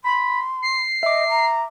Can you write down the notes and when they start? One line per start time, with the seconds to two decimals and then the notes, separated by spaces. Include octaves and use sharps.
0.04 B5 C6
0.62 C7
1.03 D#5 E5 D6
1.29 A#5